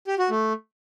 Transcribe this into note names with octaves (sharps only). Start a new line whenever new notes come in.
G4
F#4
A3